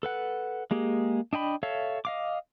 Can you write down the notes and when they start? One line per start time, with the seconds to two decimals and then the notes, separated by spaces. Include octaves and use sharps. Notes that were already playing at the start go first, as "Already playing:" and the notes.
0.03 A4 B4 F#5
0.71 G#3 A#3 G4 G#4
1.33 D4 D#5 G5 B5
1.63 A4 C#5 E5 F5
2.05 D#5 F5 D6